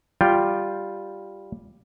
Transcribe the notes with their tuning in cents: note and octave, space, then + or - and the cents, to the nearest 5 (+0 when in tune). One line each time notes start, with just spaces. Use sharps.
G3 +0 F4 +0 G5 +0